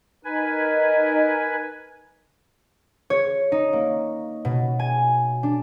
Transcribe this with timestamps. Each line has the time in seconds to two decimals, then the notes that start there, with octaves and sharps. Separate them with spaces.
0.24 D#4 A#4 B4 G#5
3.10 C#5
3.52 D#4
3.73 A#3
4.45 B2
4.80 G#5
5.43 D4